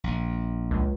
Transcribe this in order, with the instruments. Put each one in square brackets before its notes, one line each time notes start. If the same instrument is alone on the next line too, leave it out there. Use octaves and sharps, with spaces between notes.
[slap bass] A#1
[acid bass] C#2